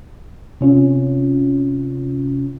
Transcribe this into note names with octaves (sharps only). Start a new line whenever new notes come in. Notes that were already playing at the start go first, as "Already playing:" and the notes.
C3 C#4 F4